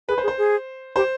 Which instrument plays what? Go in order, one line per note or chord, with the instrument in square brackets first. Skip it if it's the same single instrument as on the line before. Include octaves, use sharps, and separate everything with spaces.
[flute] G#4 [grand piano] B4
[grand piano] C5
[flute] G#4
[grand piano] C5
[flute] G#4
[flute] G4 [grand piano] C5